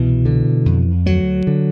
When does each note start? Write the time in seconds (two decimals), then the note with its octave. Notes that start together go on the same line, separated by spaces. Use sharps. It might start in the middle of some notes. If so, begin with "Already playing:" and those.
Already playing: C2 B2 E3
0.25 D3
0.66 F2
1.06 D2 F#3
1.47 D3